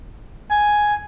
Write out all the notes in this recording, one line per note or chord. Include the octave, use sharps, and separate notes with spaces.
G#5